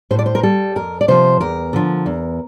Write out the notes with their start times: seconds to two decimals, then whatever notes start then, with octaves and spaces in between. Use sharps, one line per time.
0.11 A2 C5
0.19 D5
0.26 C5
0.35 A#4
0.43 G3 A4
0.76 F2 A#4
1.01 D5
1.08 C3 F3 C5
1.41 E2 A#4
1.73 D3 F3
2.06 E2